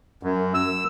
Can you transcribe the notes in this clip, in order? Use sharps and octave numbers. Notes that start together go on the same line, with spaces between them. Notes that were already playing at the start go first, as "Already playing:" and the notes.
F#2
E6